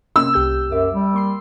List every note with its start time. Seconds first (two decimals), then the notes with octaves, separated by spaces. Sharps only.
0.16 C3 A#3 C#4 E6
0.34 C2 G4 G6
0.72 F#2 E5 D6
0.93 G3
1.14 A#3 C6 C7